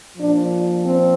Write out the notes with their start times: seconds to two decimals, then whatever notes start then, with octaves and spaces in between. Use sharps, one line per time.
0.17 A#2 F3 D4
0.85 C4